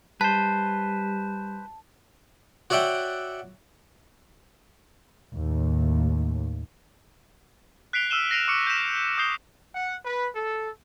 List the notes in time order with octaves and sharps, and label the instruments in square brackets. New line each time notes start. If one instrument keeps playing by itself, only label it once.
[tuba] G3 [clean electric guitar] B4 C5 [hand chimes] A5
[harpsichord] F#4 C#5 D5 E5 F#5 G5
[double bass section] D#2 A2
[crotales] F#6 B6 C7 D7 F7 G7
E6 F6 D#7 E7 G7
A#6 C7 D7 D#7 F7 G7
C#6 D6 C#7 D7
G6 B6 E7
D6 D#6 G6 C7 G7
[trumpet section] F#5
B4
A4